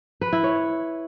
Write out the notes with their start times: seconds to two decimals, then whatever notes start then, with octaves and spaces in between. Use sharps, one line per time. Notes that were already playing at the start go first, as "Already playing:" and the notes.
0.21 B4
0.33 E4
0.44 C#5